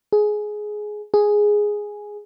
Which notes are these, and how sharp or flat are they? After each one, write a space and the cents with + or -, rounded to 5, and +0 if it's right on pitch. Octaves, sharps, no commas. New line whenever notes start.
G#4 +15
G#4 +0